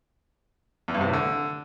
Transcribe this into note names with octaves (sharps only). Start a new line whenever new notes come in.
E2
G2
C3
A2
D3